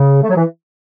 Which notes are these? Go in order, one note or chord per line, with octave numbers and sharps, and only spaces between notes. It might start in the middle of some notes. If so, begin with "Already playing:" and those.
Already playing: C#3
A3
F#3
E3